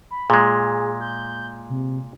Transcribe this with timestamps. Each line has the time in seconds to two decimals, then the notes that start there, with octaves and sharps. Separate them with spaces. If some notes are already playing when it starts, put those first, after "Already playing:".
0.11 B5
0.30 A#2 G#3 G#4
1.00 G6
1.70 C3